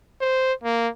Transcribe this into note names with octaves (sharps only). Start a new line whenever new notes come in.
C5
A#3